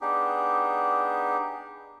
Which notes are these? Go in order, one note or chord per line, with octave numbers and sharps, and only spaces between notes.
B3 D4 D#4 G4 G#4